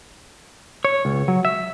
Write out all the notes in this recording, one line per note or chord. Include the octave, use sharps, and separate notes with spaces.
C#5
C#2
F#3
E5